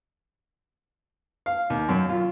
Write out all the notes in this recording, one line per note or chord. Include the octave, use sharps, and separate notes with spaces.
F5
D#2
F#2
F4